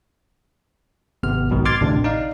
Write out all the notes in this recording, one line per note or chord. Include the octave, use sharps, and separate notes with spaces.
G#1 C3 B3 F6
B1 G#2 B2 D#3
C6 D6 F6 G#6 A6 C7
A1 D2 C3 D4
D#4 D5 F5